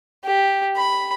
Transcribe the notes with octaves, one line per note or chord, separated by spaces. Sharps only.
G4
B5